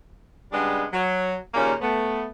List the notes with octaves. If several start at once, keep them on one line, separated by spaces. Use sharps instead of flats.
C#3 G3 G#3 B3 D4
F#3
D#2 A#2 C#3 G3 A#3 C#4
A3 B3